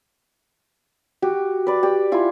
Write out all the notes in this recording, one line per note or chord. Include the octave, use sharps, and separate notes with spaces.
F#4 G4
B4 D5
G4 D5
E4 F4 G#5